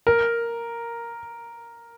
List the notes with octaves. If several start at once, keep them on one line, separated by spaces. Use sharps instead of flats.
A#4